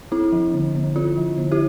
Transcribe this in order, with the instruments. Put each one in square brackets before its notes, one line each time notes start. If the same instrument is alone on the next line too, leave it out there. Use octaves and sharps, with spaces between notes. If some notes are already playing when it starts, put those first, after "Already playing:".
[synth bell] C4 E4
F3
D3
D3
C4 F4
F3
D3
E4 G4